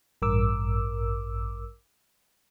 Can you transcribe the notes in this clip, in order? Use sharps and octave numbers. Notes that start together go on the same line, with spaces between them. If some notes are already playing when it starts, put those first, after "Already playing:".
A1 G2 A#4 D6 E6